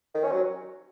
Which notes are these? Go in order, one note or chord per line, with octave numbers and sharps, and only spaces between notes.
D#3
C#4
F#3